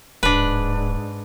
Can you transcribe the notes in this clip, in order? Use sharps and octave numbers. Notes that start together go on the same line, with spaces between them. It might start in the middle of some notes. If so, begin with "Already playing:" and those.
D1 G#2 D4 B4